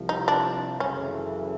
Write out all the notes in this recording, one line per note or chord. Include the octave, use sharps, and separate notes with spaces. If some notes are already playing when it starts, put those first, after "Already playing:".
Already playing: C2 C3 F3
D#4
D4
F#2 C#3 E3 A3 C#4